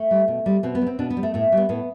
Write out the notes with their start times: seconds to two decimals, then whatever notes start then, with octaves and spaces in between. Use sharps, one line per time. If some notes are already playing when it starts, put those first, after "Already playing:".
Already playing: A3
0.11 G3
0.28 B2
0.46 G3
0.63 B2 C4
0.75 B3
0.82 G3
0.87 C4
0.99 B2 D4
1.10 B3
1.17 G3
1.23 A3
1.34 A2 A3
1.52 G3 B3
1.69 A2 B3